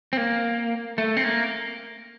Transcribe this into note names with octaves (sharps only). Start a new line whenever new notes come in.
C4
A#3
A3
C4
A#3